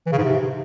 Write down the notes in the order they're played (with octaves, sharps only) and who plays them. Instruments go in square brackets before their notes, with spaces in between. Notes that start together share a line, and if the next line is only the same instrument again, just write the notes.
[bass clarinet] E3
C#3
G#2
C3